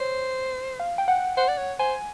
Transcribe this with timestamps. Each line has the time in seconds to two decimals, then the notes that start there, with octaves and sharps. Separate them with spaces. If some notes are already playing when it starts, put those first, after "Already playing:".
Already playing: C5 C#5
0.80 F5
0.98 G5
1.08 F#5
1.37 C5 F#5
1.48 D5
1.58 C#5
1.79 C5 G#5